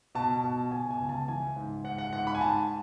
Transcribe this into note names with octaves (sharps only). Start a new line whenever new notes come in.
B2 A5
B2
B2 G#5
G#5
C#2
A5
E3 G#5
G#2
G#2 F#5
F#5
G#2 F#5
B5
G#5
G#2 A5